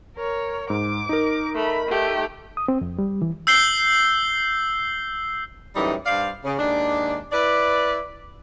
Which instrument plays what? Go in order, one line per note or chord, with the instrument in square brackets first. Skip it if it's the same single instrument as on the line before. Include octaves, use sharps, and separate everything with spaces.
[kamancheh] A#4 C#5
[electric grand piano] G#2 [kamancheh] D6
[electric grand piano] D#4 A#4
[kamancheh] A3 B5
A3 G4
[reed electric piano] D#6
C4
F2
G3
E3
[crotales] E6 G6 C7 G7
[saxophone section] F#2 A2 E3 G3 D#4
G2 C5 D5 F5
C#3
D#2 G#3 D4
E4 B4 D5